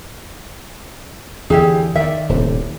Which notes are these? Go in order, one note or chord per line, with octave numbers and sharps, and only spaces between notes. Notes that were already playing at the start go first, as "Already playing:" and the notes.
E2 D3 E4 G4 G#4
D#3 D5 E5
D#1 A2 C3